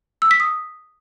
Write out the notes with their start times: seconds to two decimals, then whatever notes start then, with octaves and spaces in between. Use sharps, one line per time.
0.22 E6
0.31 B6
0.40 D#6